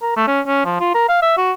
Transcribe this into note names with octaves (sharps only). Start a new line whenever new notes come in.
A#4
A3
C#4
C#4
F3
F4
A#4
F5
E5
F#4